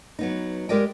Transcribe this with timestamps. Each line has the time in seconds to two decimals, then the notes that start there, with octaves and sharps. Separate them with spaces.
0.19 F#3 B3 D#4
0.69 G#3 G4 A#4 D5 D#5 G5